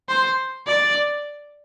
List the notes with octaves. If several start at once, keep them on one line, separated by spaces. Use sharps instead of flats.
C5
D5